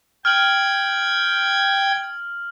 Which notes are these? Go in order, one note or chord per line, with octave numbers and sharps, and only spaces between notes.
G5 F6 G#6 F#7